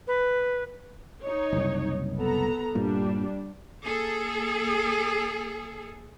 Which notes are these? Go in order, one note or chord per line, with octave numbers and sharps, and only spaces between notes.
B4
D#4 C#5
F#1 C2
B3 A4 A#5
G2 A#2 G3 D4
A#3 G#4 A4